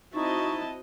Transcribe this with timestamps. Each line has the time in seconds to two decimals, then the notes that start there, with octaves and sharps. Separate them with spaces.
0.14 C4 D#4 E4 F#4 D#5 A5 C#6